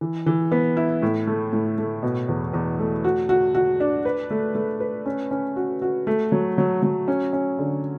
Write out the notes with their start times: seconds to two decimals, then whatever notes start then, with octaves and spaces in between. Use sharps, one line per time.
0.01 E3
0.26 E3
0.52 B3
0.77 E4
1.02 A2
1.27 A3
1.53 A2
1.78 A3
2.03 B2
2.28 E2
2.53 E2
2.79 A3
3.04 F#4
3.29 F#4
3.55 F#4
3.80 D4
4.05 B4
4.31 A3
4.55 A3
4.80 B4
5.06 C#4
5.31 C#4
5.56 F#4
5.82 F#4
6.07 A3
6.32 F#3
6.58 F#3
6.83 F#3
7.08 C#4
7.33 C#4
7.59 D3